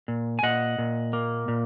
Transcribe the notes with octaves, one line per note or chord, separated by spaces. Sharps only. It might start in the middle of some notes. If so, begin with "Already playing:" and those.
A#2
G#5
A#2 D#5 F#5
A#2
A#3
A#2